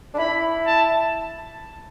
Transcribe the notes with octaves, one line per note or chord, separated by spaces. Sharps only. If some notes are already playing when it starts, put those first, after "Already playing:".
D4
E4 B5
A5